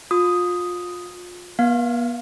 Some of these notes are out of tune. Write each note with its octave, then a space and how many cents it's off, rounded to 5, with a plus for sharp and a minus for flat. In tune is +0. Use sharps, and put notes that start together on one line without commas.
F4 +25 D#6 +0
B3 -45 F5 +30